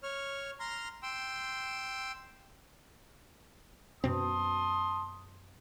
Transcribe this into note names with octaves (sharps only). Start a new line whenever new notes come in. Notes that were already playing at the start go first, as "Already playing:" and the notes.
C#5 F6
A#5 C6 F6
G5 C6 E6
F#2 B2 C4 A5 C6 D#6